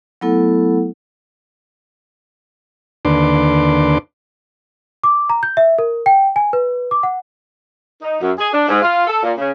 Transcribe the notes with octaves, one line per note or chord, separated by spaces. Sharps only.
F#3 A3 B3 E4 A4 F#5
D#2 D3 D4 B4 C6 D6
D6
A#5
G6
E5
A#4
G5
G#5
B4
D6
F#5
D#4
F#2
G#4
D4
G#2
F4
A4
A#2
C#3